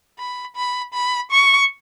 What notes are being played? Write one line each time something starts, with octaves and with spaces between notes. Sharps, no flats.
B5
B5
B5
C#6